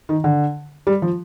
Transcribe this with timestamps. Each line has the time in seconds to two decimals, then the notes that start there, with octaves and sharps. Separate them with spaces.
0.09 D#3
0.24 D3
0.87 G3
1.02 F3